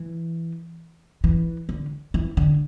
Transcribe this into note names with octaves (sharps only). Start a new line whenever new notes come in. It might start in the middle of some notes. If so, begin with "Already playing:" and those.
Already playing: E3
E3
D3
E3
D3